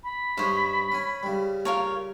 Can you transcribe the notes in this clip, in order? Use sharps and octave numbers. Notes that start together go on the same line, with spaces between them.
B5
G2 D#4 C5 C#5
C#4 G#5
C#3 G3
F4 A#4 C#5